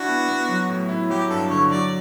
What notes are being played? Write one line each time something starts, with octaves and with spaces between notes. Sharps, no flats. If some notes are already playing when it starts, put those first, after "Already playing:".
Already playing: D4 E4 F#4
B3
B3
F#3
A2
E4
F#3 G4
G2 A4
D3 C#5
F#3 D5